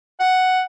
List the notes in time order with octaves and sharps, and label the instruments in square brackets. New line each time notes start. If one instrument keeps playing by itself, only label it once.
[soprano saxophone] F#5